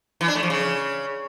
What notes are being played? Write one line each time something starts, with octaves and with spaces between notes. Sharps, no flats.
E3
D4
A3
F3
C#3